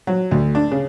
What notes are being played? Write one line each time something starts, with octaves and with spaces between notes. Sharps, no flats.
F#3
D2
D4
C#3